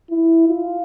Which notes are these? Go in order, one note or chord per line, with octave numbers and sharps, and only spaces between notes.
E4
F4